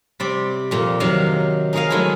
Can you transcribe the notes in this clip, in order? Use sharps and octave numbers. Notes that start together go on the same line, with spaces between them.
C3 G3 D5
F2 A#2
C3 D#3 F#3 F5
D#4 G#4 A#4 C#5 D#5 F5
D#3 F#3 G#3 A3 E4